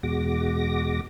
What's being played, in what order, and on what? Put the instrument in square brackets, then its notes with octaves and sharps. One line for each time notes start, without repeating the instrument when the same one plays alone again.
[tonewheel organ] E2 B2 G#3 F#4 D6 A#6